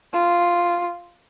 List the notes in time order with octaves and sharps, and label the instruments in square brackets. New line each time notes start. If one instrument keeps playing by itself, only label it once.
[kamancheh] F4